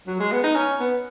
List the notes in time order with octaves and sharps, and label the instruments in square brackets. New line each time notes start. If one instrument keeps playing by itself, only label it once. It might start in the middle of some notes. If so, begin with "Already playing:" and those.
[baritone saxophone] F#3
G#3
B3
D#4
C#4
B3